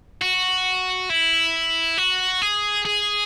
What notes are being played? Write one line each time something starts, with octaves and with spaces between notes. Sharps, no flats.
F#4
E4
F#4
G#4
G#4